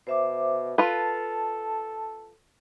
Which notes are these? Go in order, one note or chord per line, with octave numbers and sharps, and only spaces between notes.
B2 C5 E5 D6
F4 A4 B4 A5